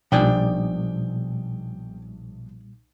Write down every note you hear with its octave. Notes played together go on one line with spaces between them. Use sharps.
B1 A#2 F3 G3 D4 G5 G#5